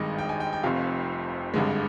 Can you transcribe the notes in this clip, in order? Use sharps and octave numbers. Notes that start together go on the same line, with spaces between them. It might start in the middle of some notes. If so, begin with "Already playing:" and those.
Already playing: G#1 G2 D#3 G#3 D#5
G5
G#5
G5
G5
F1 F2 C3 F5
G#1 G2 D3 G#3